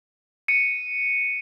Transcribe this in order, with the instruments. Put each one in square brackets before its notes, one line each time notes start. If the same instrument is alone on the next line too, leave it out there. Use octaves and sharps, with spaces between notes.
[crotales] C#7 D#7